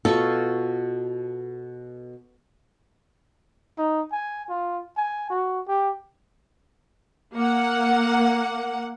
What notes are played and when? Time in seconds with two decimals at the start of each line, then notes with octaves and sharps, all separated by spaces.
0.05 B2 F4 A4 C#6
3.78 D#4
4.12 G#5
4.49 F4
4.97 G#5
5.30 F#4
5.68 G4
7.34 A#3 F#5